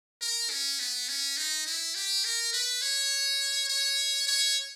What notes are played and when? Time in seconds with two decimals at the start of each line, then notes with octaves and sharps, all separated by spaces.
0.21 A#4
0.50 C#4
0.80 B3
1.09 C#4
1.37 D#4
1.67 E4
1.95 G4
2.25 A#4
2.53 B4
2.82 C#5
3.68 C#5
4.27 C#5